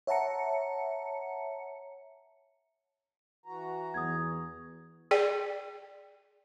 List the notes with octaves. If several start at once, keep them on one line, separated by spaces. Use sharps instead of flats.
C#5 E5 F#5 A5 A#5 C#7
E3 F#4 A#5
E2 D#6 G#6
G#4 D5 G5